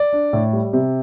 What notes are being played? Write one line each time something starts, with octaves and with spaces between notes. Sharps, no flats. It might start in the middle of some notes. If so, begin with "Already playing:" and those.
Already playing: D5
D4
A2
G3
C3